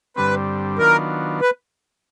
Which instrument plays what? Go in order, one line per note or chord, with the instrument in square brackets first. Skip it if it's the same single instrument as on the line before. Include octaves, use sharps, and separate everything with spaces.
[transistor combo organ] G2 D3 G3 C4 [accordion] B4
[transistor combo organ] D#3 F#3 B3 D4 F4 [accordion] A#4
[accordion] B4